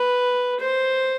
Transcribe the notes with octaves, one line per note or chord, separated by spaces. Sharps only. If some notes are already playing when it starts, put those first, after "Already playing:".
Already playing: B4
C5